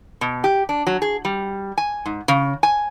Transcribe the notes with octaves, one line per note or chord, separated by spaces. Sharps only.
B2
G4
D4
F#3
G#4
G3
G#5
G#2
C#3
G#5